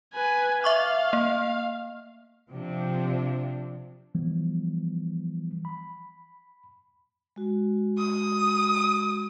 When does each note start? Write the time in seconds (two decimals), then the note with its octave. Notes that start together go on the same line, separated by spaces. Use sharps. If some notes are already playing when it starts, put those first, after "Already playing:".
0.14 B4 G#5
0.64 E5 F5 C#6 D6
1.13 A#3
2.49 C3 F3 C4 D4
4.15 E3 F3 G3 B3
5.65 B5
7.36 G#3 F#4
7.98 D#6